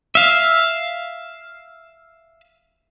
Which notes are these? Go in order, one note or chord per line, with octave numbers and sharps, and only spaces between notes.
E5 F5